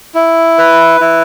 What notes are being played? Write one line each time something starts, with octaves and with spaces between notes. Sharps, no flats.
E4
B4
E4